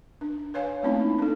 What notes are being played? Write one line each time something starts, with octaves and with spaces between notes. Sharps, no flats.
D4
B4 C#5 F5 G#5
A3 A#3 C4 C#4 D#4 E4
D4 A4